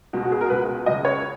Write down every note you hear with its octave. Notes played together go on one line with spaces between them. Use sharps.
C#2 B2
F#4
G#4
A#4
C#2 B2 B4
C#2 C#3 D#5
C#5